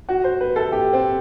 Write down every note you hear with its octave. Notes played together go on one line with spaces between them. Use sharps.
F#4
C5
B4
A4
G4
C4